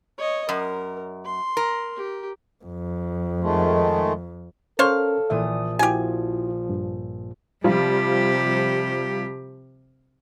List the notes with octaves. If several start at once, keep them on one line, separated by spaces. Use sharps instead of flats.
C#5 D#5
F#2 A#4
C6
A#4
G4
F2
D#3 G#3 A3
C#4 A4 A#4 C5 C#5 F5
A#1 A#2 E3 E5 D#6
F3 E4 F#4 G4 G#5
G2
C3 F3 G3 F4 G4